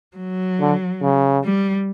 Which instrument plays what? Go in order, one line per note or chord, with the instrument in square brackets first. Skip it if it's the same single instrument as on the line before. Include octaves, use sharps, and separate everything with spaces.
[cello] F#3
[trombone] D3
C#3
[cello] G3